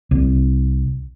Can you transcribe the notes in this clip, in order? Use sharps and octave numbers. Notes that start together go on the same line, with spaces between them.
C2